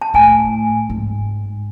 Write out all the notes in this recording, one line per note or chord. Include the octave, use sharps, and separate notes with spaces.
A5
A2 G#5
G#2